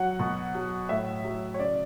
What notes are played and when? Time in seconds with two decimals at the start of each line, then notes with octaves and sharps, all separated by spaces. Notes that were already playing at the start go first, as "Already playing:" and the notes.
Already playing: F#3 F#5
0.20 B2
0.55 F#3
0.89 A2 E5
1.24 F#3
1.54 C#5
1.59 C#3 D5